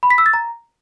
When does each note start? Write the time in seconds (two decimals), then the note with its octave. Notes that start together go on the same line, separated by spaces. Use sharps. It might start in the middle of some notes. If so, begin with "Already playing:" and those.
0.03 B5
0.10 B6
0.18 E6
0.26 A6
0.34 A#5